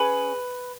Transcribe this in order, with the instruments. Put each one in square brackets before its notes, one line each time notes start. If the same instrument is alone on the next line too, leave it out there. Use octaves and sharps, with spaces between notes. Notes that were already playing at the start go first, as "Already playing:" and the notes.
Already playing: [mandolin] C#4 G#4 B4